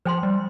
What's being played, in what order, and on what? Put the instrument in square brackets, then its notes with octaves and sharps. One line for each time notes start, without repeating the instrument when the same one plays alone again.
[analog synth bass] F3 [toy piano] C5 G5 C6
[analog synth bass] G3